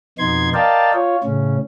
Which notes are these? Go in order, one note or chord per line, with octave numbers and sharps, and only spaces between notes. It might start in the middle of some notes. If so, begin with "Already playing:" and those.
F2 B2 B3 D#4 C6 G#6
A#4 D5 D#5 F5 G5 A5
F4 C#5
A2 C#3 C#4